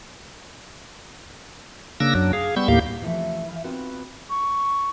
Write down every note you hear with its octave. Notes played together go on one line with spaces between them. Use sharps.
C#3 A#3 D4 E6 A#6
F#2 F#3 D4
G#4 F5
G3 B3 C#6 E6 G6
D#2 A2 A#3 G4 F5 G6
C3 E3 F3 A3 C#4
E3 E5 F5
B3 C4 D#4 F4 F#4 B4
C#6